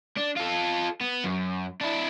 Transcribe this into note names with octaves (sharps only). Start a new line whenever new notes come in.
D4
F4 A4
B3
F#2
D4 E4